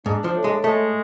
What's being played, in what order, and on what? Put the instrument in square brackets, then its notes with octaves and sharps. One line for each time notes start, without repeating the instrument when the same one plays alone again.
[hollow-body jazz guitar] G#2 [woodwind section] D4
[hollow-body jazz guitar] F3
[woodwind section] A2
[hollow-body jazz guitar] G#3
[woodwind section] G#3 [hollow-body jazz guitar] A3